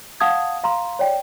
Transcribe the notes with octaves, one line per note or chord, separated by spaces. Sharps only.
F5 F#5 A5 D#6 G#6
F5 A#5 C6
C#5 D5 G5